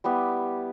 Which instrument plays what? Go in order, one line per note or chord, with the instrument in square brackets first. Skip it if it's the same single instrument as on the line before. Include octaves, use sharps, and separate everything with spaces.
[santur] G3 B3 E4 G4